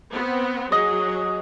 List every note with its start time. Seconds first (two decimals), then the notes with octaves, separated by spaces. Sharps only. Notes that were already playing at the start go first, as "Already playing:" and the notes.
0.12 B3 C4
0.72 F#3 G#4 D#5